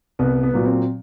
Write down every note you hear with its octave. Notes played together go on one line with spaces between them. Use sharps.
C2 B3
B3
A#2 F#3
C4